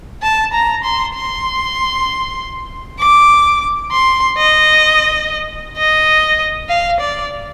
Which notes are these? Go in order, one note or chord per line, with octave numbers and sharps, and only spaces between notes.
A5
A#5
C6
C6
D6
C6
D#5
D#5
F5
D5